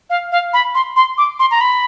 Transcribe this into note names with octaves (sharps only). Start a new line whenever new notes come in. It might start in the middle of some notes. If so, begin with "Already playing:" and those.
F5
F5
B5
C6
C6
D6
C6
A#5
B5